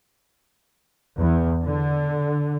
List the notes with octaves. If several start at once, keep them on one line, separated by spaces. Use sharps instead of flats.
E2
D3